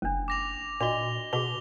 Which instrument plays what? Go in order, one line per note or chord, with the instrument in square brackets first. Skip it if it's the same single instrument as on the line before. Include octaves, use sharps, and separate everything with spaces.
[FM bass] F#1 [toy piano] C#4 D4
[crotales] D6 A#6 F7
[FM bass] A#2 [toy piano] D4 F#4 D#5 [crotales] F7 G7
[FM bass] B2 [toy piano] F#4 G#4 [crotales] F7 G7